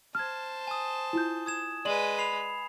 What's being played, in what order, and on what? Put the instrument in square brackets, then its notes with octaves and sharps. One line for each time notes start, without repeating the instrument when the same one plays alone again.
[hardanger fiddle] C5 A5 [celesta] F6 G#6
[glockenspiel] G#5 D#6
[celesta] E4 F4 G6
[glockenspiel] D#6 G#6 E7
[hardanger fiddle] G#3 B4 [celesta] D5 F#7
[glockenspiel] B5 C7 F7